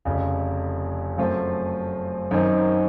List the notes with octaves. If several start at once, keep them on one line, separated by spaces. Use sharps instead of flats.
F1 F2 C#3
F#2 F3 A3 C4 F4
F#2 D#3 F#3 C4 D#4